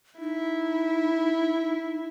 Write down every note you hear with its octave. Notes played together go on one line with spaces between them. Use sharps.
D#4 E4